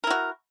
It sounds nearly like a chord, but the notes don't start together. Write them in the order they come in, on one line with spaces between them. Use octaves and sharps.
A#4 E4 F#4